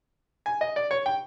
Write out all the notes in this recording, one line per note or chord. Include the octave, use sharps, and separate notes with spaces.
G#5
D#5
D5
C#5
G5